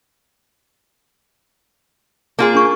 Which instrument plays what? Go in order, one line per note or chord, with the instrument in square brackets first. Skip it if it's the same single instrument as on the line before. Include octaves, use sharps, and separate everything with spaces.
[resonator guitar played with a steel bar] A#3 F4 G#4
[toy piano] D4 C#6